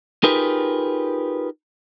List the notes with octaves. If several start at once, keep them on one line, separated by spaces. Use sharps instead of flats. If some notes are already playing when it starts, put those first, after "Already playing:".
D#4 F4 G4 G#4 A#4 B4